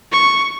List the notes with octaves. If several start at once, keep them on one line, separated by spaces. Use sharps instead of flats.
C#6